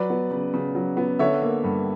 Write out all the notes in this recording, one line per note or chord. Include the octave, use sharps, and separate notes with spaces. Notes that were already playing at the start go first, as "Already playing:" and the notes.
Already playing: F#3 B4 D5
B3
C#3
C#3
F#3
B3
D3 C#5 E5
A#3
G2